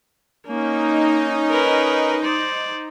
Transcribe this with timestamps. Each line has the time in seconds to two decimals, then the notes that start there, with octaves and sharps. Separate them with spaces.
0.47 A#3 C#4 D#4
1.50 A#4 B4
2.23 C5 D5